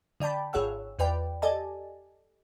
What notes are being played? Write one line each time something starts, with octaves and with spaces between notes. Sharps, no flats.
D3 D5 G5 A5 B5
G#1 F4 G#4 C#5 F#5 E6
E2 F4 B4 D5 G5
G4 A4 D5 D#5 G#5 A5